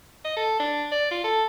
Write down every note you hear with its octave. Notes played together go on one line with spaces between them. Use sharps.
D#5
A4
D4
D5
F4
A4